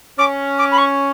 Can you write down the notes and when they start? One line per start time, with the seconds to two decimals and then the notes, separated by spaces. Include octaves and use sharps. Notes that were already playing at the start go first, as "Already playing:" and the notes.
0.18 C#4 D6
0.58 D6
0.71 B5
0.77 C#6